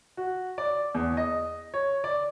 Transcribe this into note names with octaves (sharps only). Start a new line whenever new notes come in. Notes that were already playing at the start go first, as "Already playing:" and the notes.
F#4
D5
E2
D#5
C#5
D5